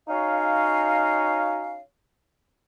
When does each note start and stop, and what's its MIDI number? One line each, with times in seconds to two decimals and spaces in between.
0.08 1.80 61
0.08 1.80 63
0.08 1.80 66
0.08 1.80 73
0.08 1.80 77